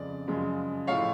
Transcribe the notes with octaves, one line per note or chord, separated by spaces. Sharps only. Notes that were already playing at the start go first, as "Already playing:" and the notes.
Already playing: F2 C#3 G#3 D5
F#2 C#3 F3 G#3
A2 F3 G#3 C#5 F5